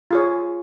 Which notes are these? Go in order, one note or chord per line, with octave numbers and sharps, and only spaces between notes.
F4 G#4 C#5